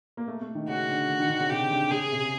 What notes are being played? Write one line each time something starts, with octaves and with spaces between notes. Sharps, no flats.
A#3
A3
A3
D#3
C#3 F#4
D3
D3
D#3
D3
C#3
C3 G4
D3
C#3 G#4
C3